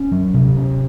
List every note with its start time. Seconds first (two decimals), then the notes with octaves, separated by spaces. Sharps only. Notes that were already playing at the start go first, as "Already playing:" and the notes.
Already playing: C#4
0.12 F#3
0.34 C3
0.56 C#4